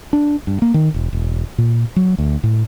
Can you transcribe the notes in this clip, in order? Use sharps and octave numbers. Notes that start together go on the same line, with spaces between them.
D4
G2
A#3
D#3
E1
E1
A#2
F#3
D2
A2